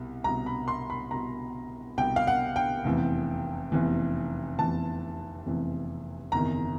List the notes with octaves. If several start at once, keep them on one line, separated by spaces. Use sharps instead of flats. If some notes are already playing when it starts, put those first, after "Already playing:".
Already playing: C2 B2
C2 B2 A#5
B5
C6
B5
C2 B2 A#5
C2 B2 G5
F5
F#5
G5
F1 E2 C3 E3
F1 E2 C3 E3
F1 E2 C3 E3 A5
F1 E2 C3 E3
F#1 E2 C3 D#3 A#5